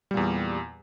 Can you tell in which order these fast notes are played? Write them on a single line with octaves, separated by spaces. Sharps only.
G3 A#2 E2